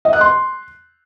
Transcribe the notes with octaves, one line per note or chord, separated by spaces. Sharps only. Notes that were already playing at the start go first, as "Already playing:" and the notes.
D#5
F#6
C6